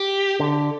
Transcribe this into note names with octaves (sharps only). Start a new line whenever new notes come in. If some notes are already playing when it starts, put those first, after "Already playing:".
Already playing: G4
D3